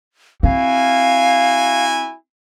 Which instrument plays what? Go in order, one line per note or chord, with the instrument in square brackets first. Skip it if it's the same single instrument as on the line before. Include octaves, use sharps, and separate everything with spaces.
[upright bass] C4 [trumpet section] E4 F#4 G#5 [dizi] F5